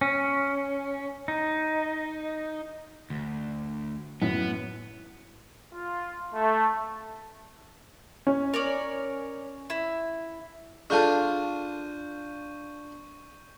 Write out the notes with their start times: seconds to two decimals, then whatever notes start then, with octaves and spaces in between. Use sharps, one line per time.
0.01 C#4
1.28 D#4
3.10 D2
4.22 F#2 A2 B3
5.73 F4
6.35 A3
8.27 C#4
8.54 A#4 C#5 D5
9.70 E4
10.90 D4 F4 G#4 A4 A5 C#6 G6 D#7